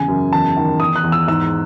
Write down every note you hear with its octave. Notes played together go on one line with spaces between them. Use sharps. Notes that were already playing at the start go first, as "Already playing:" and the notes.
Already playing: E2 C#3 G#5
F#2
E2 A5
D#3
E2 D#6
F#6
E2
E6
G#2 E6